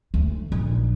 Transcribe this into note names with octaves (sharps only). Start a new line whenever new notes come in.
D2
A#1